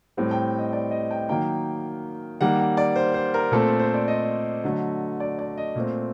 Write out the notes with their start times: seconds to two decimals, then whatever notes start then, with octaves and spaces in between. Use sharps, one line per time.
0.17 A2 G3 C4
0.31 G5
0.58 D#5
0.73 D5
0.91 D#5
1.11 G5
1.29 D#3 F#3 A#3 G5
2.41 D#3 G3 A#3 F#5
2.59 F#5
2.77 D5
2.96 C5
3.14 C5
3.34 A#4
3.51 A#2 A3 C4 A4
3.79 C5
3.94 D5
4.08 D#5
4.63 D3 F#3 A3
5.20 D5
5.39 D5
5.57 D#5
5.76 A#2 A3 C4